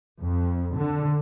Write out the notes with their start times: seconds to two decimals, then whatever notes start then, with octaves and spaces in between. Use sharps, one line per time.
0.21 F2
0.75 D3